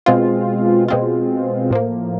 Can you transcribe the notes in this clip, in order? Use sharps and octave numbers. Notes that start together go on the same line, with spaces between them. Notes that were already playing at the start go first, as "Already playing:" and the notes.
B2 G#3 C4 F4
B2 G#3 C4 F4
A2 F3 A#3